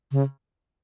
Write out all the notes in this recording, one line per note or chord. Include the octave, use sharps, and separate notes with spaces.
C#3